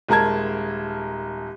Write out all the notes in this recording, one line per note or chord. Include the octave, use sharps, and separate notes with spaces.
D#1 G#3 A#4 A5 G#6